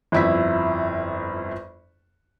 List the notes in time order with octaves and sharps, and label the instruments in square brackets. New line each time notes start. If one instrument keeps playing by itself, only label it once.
[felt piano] G1 F2 E4 E5 B6